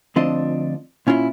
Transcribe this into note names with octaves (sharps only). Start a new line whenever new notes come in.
D2 F3 C4 D4 F4 D#5
A#2 C#4 E4 F4